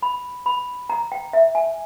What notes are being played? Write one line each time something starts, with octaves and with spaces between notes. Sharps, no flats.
B5
B5
A#5
G5
E5
G#5